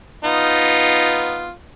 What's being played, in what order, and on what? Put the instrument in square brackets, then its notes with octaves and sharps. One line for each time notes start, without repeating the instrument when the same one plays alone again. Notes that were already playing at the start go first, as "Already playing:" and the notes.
[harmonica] B3 D#4 F4